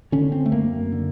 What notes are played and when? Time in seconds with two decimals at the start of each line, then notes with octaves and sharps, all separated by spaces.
0.12 D3 C#4
0.32 C4
0.46 A3
0.52 F#2 A#3
0.92 D3